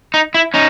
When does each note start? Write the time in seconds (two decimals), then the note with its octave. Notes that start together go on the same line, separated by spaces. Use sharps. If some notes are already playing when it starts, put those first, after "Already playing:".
0.14 D#4
0.34 E4
0.54 C#4 D#4